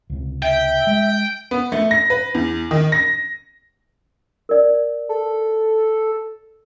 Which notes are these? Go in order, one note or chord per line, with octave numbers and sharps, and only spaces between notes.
C#2 C3
E5 G5
G#3
B3
A3
A#6
B4
E2
D#3
A#6
A#4 D5
A4